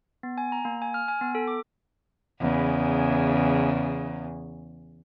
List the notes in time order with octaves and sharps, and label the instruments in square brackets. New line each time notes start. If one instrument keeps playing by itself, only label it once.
[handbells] B3
G#5
A#5
A#3
G#5
F6
G#5
B3
A4
D6
[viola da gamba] E2 C#3